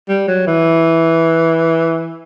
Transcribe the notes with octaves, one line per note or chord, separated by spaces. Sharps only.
G3
F#3
E3